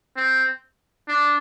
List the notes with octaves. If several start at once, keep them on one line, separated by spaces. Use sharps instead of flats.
C4
D4